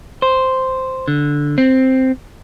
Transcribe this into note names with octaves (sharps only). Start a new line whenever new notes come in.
C5
D3
C4